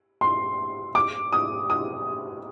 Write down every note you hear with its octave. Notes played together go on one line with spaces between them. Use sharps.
C6
D6
D#6
D#6